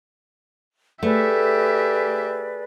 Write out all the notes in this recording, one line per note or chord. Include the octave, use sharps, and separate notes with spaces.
A3 G4 G#4 B4 D5 E5